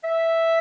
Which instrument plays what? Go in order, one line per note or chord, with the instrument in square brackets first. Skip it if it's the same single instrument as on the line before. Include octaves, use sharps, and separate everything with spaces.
[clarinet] E5